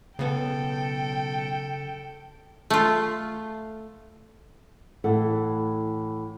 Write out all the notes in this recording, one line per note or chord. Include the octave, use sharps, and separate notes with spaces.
B1 C#3 B3 A4 B4 G5
A3 F4
A2 E3 A4 F#5